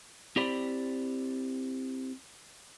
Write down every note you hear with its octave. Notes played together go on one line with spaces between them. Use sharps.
C4 E4 G4 C5 D5 B5